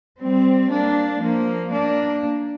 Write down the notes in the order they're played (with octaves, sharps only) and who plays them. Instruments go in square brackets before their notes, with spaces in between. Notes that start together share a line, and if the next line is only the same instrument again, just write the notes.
[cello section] G3 C4
A#3 D4
F3 A#3
A#3 D4